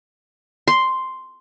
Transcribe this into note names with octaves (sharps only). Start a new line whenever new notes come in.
C6